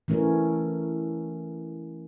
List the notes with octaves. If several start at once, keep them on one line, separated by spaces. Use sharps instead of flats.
E3 A3 C#4 A#4